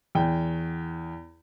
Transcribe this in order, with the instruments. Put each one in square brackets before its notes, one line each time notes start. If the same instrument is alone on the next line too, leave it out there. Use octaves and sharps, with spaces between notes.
[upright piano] E2 G5